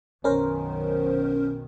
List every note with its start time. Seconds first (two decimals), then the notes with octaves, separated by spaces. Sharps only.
0.24 B1 F#2 D#3 C#4 A#4 C5